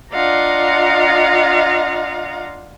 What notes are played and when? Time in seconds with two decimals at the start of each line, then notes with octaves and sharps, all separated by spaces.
0.14 D4 F4 D#5 F5 F#5 A#5